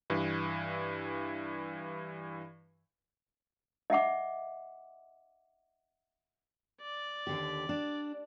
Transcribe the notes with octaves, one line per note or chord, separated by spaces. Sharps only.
G2 E3
D#5 E5 F#5 D6
D5
D#2 D3 G4
D4